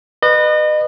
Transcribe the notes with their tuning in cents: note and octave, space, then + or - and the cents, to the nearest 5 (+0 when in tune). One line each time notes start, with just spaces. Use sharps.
B4 +0 D#5 -35